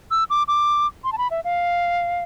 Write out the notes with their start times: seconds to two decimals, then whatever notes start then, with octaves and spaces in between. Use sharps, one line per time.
0.11 E6
0.30 D6
0.48 D6
1.04 C6
1.12 A5
1.18 B5
1.31 E5
1.44 F5